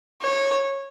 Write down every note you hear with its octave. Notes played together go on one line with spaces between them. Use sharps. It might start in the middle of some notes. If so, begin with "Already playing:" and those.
C#5